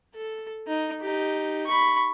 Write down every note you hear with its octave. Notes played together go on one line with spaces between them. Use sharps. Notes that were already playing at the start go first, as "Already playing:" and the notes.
A4
D#4
D#4 G4
B5 C#6